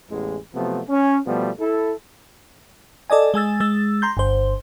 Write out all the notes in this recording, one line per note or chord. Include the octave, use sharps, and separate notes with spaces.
A1 E2 G#3
C3 F3 F#3 A3 B3
C#4
B2 F3 G3 A3 B3
E4 A4
A4 D5 D#5 G#5
G#3 G#5 E6 A6
G#3 E6 A6
A#5 C6 G6
G1 C5